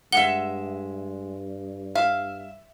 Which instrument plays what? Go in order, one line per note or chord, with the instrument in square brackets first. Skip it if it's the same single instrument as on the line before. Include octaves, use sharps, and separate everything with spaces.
[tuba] G2 [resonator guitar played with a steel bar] G#3 E5 [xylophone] F#5 G7
[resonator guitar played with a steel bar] E5 [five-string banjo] F5